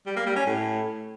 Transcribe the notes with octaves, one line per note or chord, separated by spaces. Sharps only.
G3
A#3
G3
C#4
A2